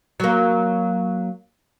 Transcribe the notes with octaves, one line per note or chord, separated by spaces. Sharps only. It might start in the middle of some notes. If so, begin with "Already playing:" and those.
F#3 A#3